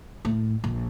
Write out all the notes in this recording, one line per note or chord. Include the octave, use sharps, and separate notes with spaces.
A2
A#1